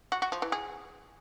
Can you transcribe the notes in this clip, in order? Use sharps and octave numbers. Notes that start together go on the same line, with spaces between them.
F#4
F#4
F3
E3
G#4